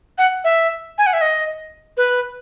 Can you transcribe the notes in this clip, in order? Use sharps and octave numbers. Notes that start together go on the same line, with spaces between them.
F#5
E5
G#5
F#5
E5
D#5
B4